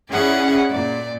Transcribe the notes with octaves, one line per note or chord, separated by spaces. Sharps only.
C#4 E4 G#4 D5 F#5
A#2 D5